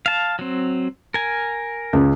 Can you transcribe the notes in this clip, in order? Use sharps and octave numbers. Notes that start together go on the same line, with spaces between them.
F5 A5
F#3 C4
A#4 G#5
C#2